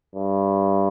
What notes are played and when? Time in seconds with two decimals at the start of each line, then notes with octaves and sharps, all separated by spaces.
0.15 G2